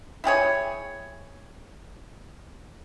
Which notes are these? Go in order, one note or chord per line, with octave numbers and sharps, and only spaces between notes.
E4 G4 G#4 C#5